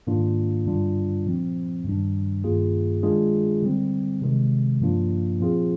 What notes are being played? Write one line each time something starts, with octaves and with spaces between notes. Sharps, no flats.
G#2 D#3 A#3 D4 F4
G2 D3 G3 D4 F4
A#2 F3 C4
G2 D#3 G3 D4
G2 D#3 A#3 F4 G#4
D#3 G#3 D4 F4 G#4
D3 G3 C4
C3 D#3 G#3
G2 F3 A#3 D4 F4
A#2 F3 C4 F4 G#4